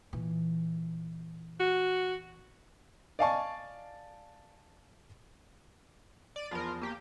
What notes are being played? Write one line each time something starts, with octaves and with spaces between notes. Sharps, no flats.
A#2 E3
F#4
D5 D#5 F5 G#5 A5 C#6
D5 D#7
E2 F3 F4 A#4 B5
A#3 G4